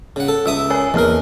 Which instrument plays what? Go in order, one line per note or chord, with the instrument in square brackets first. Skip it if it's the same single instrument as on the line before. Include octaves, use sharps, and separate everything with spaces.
[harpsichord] C#3 F#5
A4
[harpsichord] C#2 E5 D#6 [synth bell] E6
[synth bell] A#4 C#5 G#5
[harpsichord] E2 A#4 [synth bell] E3 A#3 F6